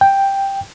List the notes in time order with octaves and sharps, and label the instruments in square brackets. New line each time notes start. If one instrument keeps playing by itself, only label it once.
[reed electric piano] G5